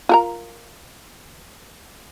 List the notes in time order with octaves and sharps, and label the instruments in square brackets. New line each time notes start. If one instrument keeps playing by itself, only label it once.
[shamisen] F4 A#4 A#5